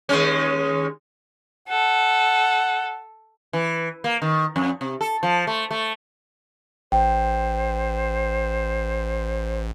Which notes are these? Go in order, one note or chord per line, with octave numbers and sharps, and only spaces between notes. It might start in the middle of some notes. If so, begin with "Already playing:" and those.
D#2 G#3 C#4
A4 F#5
E3
A#3
D#3
F2
C3
A4
F3
A3
A3
A1 C5 G5